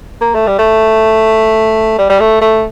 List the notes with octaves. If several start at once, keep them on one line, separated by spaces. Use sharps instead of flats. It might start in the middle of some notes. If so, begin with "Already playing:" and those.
A#3
A3
G3
A3
G3
G3
A3
A3